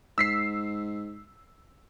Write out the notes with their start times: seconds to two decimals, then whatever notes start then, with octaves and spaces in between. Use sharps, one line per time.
0.18 G#2 E6 B6 C7